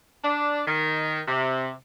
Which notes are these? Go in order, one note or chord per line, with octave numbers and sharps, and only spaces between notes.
D4
D#3
C3